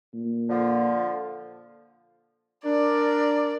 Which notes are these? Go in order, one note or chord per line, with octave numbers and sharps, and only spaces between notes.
A#2
D3 F3
D4 A#4 D5